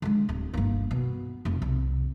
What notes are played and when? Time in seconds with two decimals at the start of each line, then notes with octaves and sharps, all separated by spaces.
0.02 D3 G#3
0.29 D1
0.54 G1 A#3
0.91 B2
1.45 F1
1.62 C2